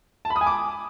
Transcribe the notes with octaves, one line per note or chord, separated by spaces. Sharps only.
A5
B5
D#6
G#5
D6